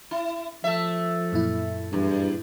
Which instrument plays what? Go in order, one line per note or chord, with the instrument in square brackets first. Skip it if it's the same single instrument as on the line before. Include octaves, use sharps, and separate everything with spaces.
[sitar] E4
[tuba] F3 [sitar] A3 E5
[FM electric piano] F#2 A#2 E4
[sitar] E2 [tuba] G2